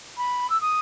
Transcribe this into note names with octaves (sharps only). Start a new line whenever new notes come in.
B5
E6
D#6